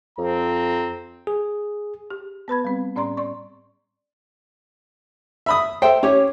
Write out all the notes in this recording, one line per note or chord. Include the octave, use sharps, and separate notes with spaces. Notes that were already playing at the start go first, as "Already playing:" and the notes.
F2 C4 A#5
G#4
G4
B3 B4 B5 G#6
G3 C4
A2 C#4 D5 A#5 C6
D5 C6 C#6
E5 B5 D#6
A4 C5 E5 G5
C#4 G4 C#5